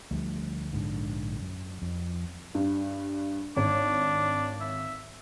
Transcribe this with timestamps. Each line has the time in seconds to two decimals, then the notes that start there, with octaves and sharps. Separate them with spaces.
0.11 D2 F3 G3 A3
0.73 A#1 G#2 D3
1.40 F#2
1.82 F2
2.55 G2
3.57 G#1 D4 C#5
4.61 E5